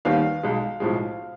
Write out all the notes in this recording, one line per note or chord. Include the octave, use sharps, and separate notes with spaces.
D#2 D#3 G3 B3 F5
B1 B2 G#3
B1 A2 F3 G#3